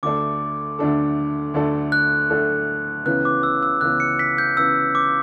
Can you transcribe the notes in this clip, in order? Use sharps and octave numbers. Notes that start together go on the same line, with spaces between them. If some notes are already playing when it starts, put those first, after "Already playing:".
D2 D3 A3 D4 A4 D6
D2 D3 A3 D4 A4
D2 D3 A3 D4 A4
F#6
D2 D3 A3 D4 A4
C#2 C#3 E3 B3 F#6
D6
E6
E6
C#2 C#3 E3 B3 F#6
C#7
B6
G6
C#2 C#3 E3 B3 E6
D6